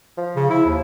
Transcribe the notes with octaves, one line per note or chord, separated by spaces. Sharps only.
F3
C#3
E4
D#2